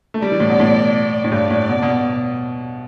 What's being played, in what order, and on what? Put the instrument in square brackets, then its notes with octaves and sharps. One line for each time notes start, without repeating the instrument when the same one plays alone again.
[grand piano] A3
[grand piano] G3 [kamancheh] D5
[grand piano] E3
A2
B2
A2
A2
[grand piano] G2 [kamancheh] D5
[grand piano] A2
B2
B2